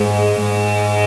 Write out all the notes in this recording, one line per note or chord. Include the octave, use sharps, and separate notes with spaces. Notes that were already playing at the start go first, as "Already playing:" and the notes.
Already playing: G#2 G#3
G#2 G#3